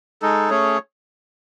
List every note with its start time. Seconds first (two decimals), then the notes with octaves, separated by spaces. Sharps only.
0.22 G#3 D#4 A4
0.50 A3 C#4 G#4 C#5